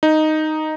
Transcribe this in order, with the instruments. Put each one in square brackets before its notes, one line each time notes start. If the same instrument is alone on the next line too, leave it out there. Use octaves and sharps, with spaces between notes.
[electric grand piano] D#4